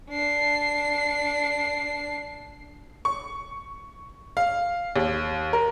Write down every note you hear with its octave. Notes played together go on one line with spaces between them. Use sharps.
D4 C7
C#6
F5
D#2
A#4